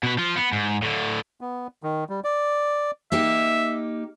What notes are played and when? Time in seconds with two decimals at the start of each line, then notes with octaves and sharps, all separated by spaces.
0.03 B2 B4
0.18 F3 F4
0.37 B3
0.53 G#2
0.82 A2 D3
1.41 B3
1.83 D#3
2.09 G3
2.24 D5
3.12 A#3 D#4 G4 E5